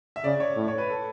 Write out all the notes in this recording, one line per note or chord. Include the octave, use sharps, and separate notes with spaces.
E5
C#3 D5
C#5
A2
C#5
B4
A4